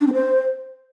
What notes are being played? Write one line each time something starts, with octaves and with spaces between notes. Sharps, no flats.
D4
C4
C5